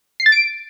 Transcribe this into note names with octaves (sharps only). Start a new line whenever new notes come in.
C7
A6
D7